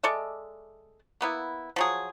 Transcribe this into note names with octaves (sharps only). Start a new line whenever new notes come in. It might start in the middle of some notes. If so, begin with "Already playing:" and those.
G#3 A4 D5 E5
A#3 B3 E4
F3 F#3 G#4